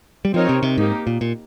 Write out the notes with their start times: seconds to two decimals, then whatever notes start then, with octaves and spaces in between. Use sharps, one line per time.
0.25 G3
0.34 F3 C4 D#4 A#4 C#5
0.49 C3
0.63 C3
0.78 G#2 A#3 D#4 G4
1.07 A#2
1.21 A#2